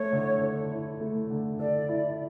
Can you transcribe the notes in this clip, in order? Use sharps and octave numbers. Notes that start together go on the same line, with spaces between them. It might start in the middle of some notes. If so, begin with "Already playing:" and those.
Already playing: A3 C#5
D3
A4
E4
A3
D3
A4 D5
E4